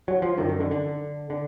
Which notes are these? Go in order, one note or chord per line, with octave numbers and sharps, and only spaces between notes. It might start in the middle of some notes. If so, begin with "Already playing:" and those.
F#3
F3
F#2 D3 D#3
D#3
D3
D3
D3